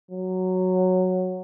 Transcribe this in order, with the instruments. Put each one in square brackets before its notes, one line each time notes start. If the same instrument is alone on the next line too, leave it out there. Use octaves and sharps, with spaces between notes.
[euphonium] F#3